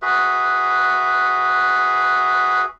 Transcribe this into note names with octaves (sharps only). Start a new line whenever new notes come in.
F#4 G#4 B4 E5